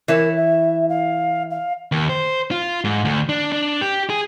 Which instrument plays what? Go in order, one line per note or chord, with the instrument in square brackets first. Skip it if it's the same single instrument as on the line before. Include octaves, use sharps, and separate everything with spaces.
[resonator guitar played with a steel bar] E3 E4 C#5 [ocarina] A#4
[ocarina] E5
F5
F5
[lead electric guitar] D#2
C5
F4
G#2
D2
D4
D4
G4
G#4